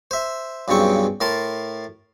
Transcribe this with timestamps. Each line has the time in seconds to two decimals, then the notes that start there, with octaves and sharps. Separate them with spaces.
0.11 C5 E5
0.68 B1 G2 C#3 C4 C#6
1.21 A2 A#4 A5 C6